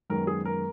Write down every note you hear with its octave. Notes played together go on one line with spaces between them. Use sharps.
F#2 D#3 G#3 B3 A#4
G#4
A#4